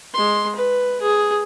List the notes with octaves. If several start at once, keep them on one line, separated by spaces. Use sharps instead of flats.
G#3 C6
B4
G#4